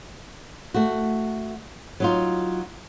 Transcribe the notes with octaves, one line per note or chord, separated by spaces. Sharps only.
A3 F#4
F#3 D#4 F4